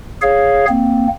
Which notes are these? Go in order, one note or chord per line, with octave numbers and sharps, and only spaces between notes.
G#4 C#5 F5
A#3 C4